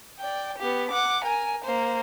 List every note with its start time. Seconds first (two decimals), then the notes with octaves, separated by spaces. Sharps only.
0.19 D5 G5
0.58 B3 G4
0.91 F#5 D6
1.24 A#4 G#5
1.64 A#3 C5